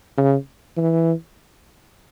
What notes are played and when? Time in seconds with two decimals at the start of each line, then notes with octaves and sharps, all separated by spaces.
0.17 C#3
0.77 E3